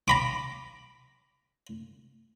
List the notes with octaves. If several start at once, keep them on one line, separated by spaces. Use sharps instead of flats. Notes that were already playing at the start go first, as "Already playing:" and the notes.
A#5 B5 D6